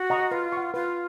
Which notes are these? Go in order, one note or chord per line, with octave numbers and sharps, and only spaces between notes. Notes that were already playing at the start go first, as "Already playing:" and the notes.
Already playing: F#4
D#5 F#5 A#5 C#6
F4 B4
F#5 C#6
F4 B4